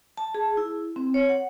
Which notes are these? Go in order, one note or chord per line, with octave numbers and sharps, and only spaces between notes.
A5
G#4
E4
C4
C#5
F#5